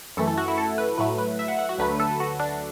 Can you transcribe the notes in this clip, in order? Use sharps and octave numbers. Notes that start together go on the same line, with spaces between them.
F#2 E3 A3 A4
A4
F#4
E4
A4
B4
A2 F#3 A3 B4
B4
E5
F#5
F#5
F#4
D2 D3 F#3 A3 B4
A4
F#4
D4